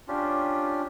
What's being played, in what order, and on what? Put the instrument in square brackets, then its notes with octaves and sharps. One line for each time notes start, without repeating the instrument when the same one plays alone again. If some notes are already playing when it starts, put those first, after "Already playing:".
[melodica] C#4 D4 F4 G4